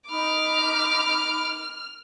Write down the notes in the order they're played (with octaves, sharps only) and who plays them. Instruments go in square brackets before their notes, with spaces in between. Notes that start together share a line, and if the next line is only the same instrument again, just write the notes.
[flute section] D#4 B5 [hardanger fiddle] D6 [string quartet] F6